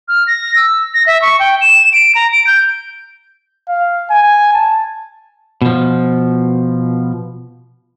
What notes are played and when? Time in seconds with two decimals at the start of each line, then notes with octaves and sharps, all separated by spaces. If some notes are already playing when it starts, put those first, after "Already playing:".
0.08 F6
0.27 A#6
0.56 E6
0.94 A#6
1.06 E5
1.22 C#6
1.40 G5
1.61 E7
1.93 D7
2.15 A#5
2.32 D7
2.47 G6
3.69 F5
4.10 G#5
4.53 A5
5.62 B2 F3